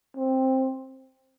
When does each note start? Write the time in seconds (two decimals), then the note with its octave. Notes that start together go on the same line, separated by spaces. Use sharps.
0.17 C4